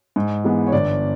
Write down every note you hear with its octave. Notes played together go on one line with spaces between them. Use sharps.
G#2
E3 G#3 B3
C#5
G1 D5